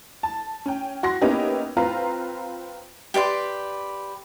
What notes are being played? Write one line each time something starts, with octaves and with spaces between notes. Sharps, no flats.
A5
C#4 G5
F#4 C6 A#6
A#3 B3 C#4 D#4 E4 G4
C4 F4 B4 F5 A#5
G4 B4 D5 C6